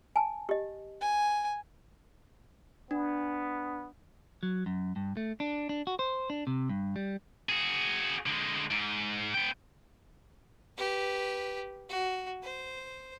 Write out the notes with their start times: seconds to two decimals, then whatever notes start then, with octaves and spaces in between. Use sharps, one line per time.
0.16 G#5 A5
0.49 G4 D#5
1.01 G#5
2.91 B3 D4
4.43 F#3
4.66 F#2
4.96 G2
5.17 A3
5.40 D4
5.69 D4
5.87 F#4
5.99 C5
6.30 D4
6.47 C3
6.69 G2
6.96 G3
7.49 F#4 G#4
8.26 D3 G#3
8.71 G#2
9.34 B3 G5
10.78 G4 B4
11.89 F#4
12.43 C5